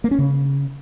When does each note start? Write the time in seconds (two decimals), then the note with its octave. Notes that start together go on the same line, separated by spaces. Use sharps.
0.04 A#3
0.11 C#4
0.19 C#3